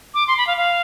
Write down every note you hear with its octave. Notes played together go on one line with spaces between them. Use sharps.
D6
C6
B5
F5
F5